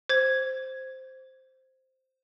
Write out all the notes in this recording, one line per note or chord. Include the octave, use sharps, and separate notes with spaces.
C5 G#6